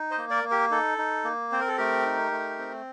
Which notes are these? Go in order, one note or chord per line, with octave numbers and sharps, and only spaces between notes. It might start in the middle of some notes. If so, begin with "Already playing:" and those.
Already playing: D#4
C5 D#5
A#3
A#4 D5
A#3
G4 A#4
D#4 A4
D#4
A#3
C4 C5
A#4
A4
A3 G4 A#4
D#4
A3
C4